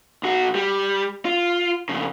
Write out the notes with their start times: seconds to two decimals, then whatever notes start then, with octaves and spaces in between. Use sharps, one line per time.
0.23 B1 F#4
0.55 G3
1.25 F4
1.89 F2 C#3